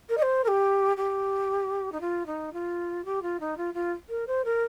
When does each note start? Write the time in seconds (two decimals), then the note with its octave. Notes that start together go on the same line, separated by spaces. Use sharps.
0.09 A#4
0.17 D#5
0.22 C5
0.44 A#4
0.48 G4
0.97 G4
1.92 D#4
2.00 F4
2.26 D#4
2.53 F4
3.05 G4
3.22 F4
3.40 D#4
3.57 F4
3.74 F4
4.09 A#4
4.27 C5
4.45 A#4